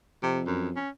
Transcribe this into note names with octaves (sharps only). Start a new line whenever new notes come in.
F2 C3
F#2
C#4